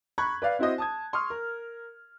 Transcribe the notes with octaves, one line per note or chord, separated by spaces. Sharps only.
A#5 B5 C#6 F#6 G#6
B4 D5 F5
C4 E4 F#4 C5 D#5
A5 D#6 G#6
C6 C#6 D#6 F6
A#4